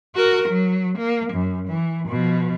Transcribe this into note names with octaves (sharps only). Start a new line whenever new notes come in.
F#4 A#4
F#3
A#3
F#2
E3
B2 F3